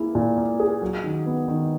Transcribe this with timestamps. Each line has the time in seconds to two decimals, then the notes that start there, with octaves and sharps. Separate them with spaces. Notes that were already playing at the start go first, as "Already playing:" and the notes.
Already playing: A#3 E4 G#4
0.15 A#2
0.38 A#3
0.60 G#4
0.82 F#3
1.04 D#3
1.26 B3
1.48 D#3